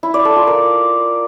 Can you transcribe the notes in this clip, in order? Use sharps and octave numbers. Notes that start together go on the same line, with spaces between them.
E4
D5
A4
F4
A#4